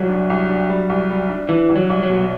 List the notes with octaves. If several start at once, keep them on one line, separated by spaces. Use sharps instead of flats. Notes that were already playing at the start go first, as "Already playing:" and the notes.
Already playing: C2 F#3
D4
C2
D4
G3
C2
G3
D4
E3 D4
C2
F#3
C2
F#3
B2